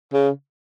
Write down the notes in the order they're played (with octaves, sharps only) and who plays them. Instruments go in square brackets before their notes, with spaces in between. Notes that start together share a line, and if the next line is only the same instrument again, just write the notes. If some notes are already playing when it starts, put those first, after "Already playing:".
[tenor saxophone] C#3